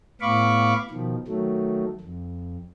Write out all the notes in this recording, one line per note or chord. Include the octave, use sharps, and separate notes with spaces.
A2 B3 F5 B5 C#6 D6
B2 D#3 F3
D#3 F#3 A3
F2